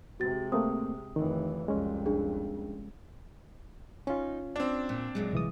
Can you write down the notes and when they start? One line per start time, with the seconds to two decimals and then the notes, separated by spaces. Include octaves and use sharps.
0.20 C3 G#3 F#4 A6
0.52 A3 A#3 C4 D#6
1.16 F1 D#3 E3
1.68 C2 F2 G#3 C#4
2.06 D4 G#4
4.07 C#4 D#4 F4
4.56 C4 D4 F5
4.89 A#2
5.15 F#2 A#2 G#3
5.33 C2 E3 D#6